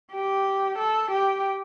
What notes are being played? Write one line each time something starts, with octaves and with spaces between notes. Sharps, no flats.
G4
A4
G4